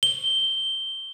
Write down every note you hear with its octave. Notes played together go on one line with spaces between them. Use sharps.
G7